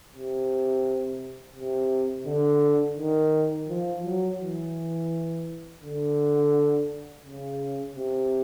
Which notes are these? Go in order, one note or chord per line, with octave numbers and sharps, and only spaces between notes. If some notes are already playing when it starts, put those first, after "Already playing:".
C3
C3
D3
D#3
F3
F#3
E3
D3
C#3
C3